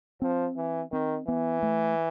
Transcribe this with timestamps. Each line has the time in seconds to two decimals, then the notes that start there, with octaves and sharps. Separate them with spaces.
0.22 F3 C4
0.57 E3
0.92 D#3 C4
1.27 E3 B3
1.63 A3